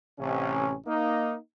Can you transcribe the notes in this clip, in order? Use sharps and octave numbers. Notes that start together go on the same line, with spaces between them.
A1 C3 C#4
A#3 D#4